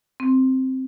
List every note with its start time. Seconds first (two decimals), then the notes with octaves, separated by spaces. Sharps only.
0.20 C4